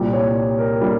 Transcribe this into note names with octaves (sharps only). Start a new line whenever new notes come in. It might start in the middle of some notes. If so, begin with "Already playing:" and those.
Already playing: C2 A#2 G3
C#5
A#4
A#2 G3